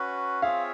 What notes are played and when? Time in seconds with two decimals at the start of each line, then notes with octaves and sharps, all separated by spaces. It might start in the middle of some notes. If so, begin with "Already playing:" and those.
Already playing: C#4 F#4 B4
0.42 C4 F4 G#4 C#5 E5 F5